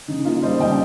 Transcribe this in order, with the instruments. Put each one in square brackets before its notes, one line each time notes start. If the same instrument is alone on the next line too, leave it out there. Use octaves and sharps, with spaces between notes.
[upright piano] C#3 D#4
A#3 F4
G3 C5 D#5
C#3 D#5 G5